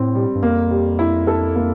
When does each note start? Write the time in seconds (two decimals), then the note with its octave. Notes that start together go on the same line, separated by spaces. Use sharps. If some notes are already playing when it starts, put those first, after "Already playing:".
Already playing: A2 C4
0.15 G3
0.35 G2
0.43 F2 A#3
0.71 G3
0.99 E4
1.27 A4
1.56 A#3